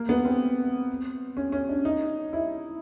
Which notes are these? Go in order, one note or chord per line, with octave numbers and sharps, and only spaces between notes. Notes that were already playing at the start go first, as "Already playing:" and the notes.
Already playing: A#3
B3
C4
C#4
C#4
D4
D#4
E4